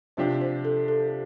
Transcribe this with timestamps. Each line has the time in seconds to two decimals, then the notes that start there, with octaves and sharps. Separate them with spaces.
0.17 C3 F3 D4 G4 C5
0.41 C5
0.65 A4
0.88 A4